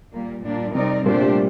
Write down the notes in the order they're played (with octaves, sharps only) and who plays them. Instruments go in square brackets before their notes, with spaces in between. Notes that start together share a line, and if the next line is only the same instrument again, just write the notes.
[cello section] A#2 G3 A#3
A#2 G3 A#3 D4
[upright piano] C3 [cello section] G3 C4 D#4 A#4 D5
[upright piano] A#2 [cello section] A3 D4 G4 C5
[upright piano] G3